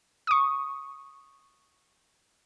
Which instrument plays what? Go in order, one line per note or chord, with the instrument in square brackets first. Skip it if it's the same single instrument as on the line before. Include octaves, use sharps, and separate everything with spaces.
[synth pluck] C#6 D#6